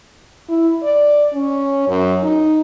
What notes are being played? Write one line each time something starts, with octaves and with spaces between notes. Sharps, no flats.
E4
D5
C#4
F#2
D#4